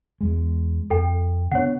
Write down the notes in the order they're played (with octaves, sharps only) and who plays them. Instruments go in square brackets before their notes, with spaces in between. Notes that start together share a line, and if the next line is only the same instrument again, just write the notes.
[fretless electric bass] E2 G#3
[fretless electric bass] F2 [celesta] A4 G5
[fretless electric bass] C#3 B3 D4 [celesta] C#5 F#5